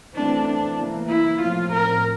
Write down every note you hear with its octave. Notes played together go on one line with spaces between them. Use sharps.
E3 A3 C4 D4
D4
E3 A#3
E4
A2 F3 C4 F4
A#4